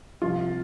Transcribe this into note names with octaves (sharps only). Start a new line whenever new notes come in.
C2 C3 F3 F4